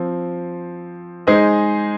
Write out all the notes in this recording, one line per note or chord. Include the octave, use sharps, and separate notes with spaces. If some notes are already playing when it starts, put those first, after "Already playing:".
Already playing: F3 C4
G#3 D#4 G#4 C5 D#5